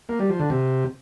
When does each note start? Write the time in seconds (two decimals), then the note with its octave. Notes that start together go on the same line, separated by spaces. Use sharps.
0.09 A#3
0.19 G3
0.30 F3
0.39 D3
0.50 C3